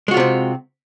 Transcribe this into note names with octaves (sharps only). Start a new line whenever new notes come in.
C3 G#3 C4 F4 F#4